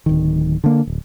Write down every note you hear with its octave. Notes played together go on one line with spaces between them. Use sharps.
D1 D#3
D3 A#3
D1